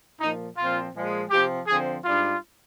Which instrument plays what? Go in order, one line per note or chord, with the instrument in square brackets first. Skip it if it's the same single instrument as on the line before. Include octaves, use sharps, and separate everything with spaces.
[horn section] A#2 F3 A#3 D#4
A#2 F3 C4 F4
A#2 F3 G#3
C3 F3 C4 G4
D3 F3 C4 G#4
G#2 G3 D4 F4